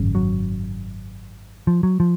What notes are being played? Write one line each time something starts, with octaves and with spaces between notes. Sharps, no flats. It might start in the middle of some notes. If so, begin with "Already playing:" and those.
Already playing: G#1 F#2 C#3
F#3
F3
F#3
F3